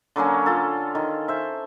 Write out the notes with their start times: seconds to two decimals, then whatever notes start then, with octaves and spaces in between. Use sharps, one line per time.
0.16 D3 F#3 A#3 C#4
0.46 F4 A4
0.95 D#3
1.28 C5 E5